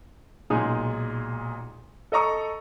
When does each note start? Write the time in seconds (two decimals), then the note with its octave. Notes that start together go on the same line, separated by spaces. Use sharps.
0.50 B1 A#2 G#3 D#4 G#4 D#6
2.12 A4 D#5 A#5 C#6 E6